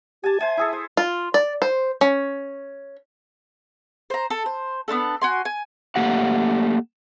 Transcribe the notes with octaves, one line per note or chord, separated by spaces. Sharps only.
G4 G#5 A5
C5 E5 G#5
E4 G#4 A4
C5
F4
D5
C5
C#4
C5 A#5
A4
C5
B3 C4 D4 A4
F#4 G#5 C6
G#5
A3 A#3 G4 F#5